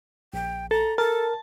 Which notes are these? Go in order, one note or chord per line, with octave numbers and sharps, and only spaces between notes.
A#1 G5
A4 A#5
A4 A#4 A5